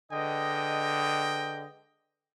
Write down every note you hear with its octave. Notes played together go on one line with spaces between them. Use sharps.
D3 G#3 B4 D#5 G5